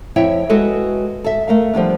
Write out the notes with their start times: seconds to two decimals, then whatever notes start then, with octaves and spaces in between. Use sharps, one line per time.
0.16 F2 E4 C#5 E5 G5
0.49 G#3 F#4 G#4 A4 B4
1.24 A4 E5
1.48 A3 A#4 F5
1.73 F3 G3 B3 D4